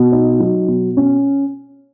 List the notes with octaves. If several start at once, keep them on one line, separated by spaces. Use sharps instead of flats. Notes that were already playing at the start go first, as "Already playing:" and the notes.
Already playing: B2
D#4
F#3
B2
C#4